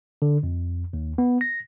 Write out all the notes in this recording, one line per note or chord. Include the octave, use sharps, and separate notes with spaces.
D3
F2
D#2
B3
A#6